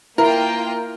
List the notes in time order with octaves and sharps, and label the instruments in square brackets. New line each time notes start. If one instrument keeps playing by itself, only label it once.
[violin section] A#3 F4 G5 [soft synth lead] E4 [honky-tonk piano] A#4